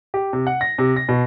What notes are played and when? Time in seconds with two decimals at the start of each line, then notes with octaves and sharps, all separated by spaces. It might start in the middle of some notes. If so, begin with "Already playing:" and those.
0.14 G4
0.33 C3
0.47 F#5
0.61 A#6
0.78 C3
0.96 A#6
1.09 B2